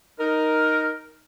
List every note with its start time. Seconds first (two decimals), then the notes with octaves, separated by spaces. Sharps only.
0.18 D#4 A#4